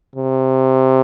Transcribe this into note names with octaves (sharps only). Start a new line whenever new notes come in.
C3